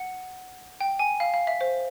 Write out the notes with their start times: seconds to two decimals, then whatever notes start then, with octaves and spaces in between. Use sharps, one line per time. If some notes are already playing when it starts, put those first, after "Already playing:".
Already playing: F#5
0.81 G5
0.99 G#5
1.20 F5
1.34 F5
1.47 E5
1.61 C5